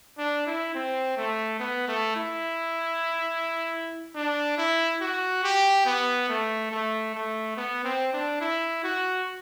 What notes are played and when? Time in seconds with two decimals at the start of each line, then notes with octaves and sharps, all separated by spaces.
0.18 D4
0.47 E4
0.75 C4
1.17 A3
1.60 B3
1.88 A3
2.16 E4
4.15 D4
4.58 E4
5.01 F#4
5.44 G4
5.86 B3
6.29 A3
6.71 A3
7.14 A3
7.57 B3
7.85 C4
8.13 D4
8.41 E4
8.84 F#4